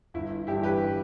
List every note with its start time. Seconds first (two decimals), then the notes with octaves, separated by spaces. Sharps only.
0.14 G1 E4
0.47 G2 E4 G4
0.52 E3
0.63 G4 B4